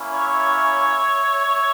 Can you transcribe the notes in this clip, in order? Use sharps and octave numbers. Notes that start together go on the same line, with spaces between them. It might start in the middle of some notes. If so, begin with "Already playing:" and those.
Already playing: A#3 C#4 E4
C#5 E5